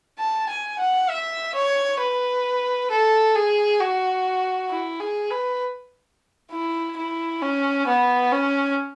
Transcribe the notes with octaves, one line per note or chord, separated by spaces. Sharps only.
A5
G#5
F#5
E5
C#5
B4
A4
G#4
F#4
E4
G#4
B4
E4
E4
C#4
B3
C#4